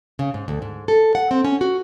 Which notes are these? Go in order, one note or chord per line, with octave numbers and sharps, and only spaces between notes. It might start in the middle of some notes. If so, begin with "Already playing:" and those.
C#3
G#2
D2
G#2
A4
F#5
C4
C#4
F#4